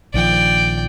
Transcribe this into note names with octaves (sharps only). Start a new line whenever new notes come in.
A#1 D#3 F3 D5 G5